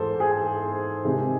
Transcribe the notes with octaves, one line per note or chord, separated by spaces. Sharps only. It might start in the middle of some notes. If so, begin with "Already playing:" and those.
Already playing: G#2 E3 G#3 A4 C5
G#4
C3 D#3 G#3